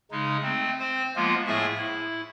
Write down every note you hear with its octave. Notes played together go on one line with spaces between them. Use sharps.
C#3 G#3 D#4
A3 C4
C4 C5
F3 G#3 A#3 B3 F4
A2 A3 G#4 E5 G#5 C#6
E4